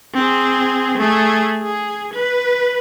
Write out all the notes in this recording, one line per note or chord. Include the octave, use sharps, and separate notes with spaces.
C4 G#4
A3 G#4
G#4
B4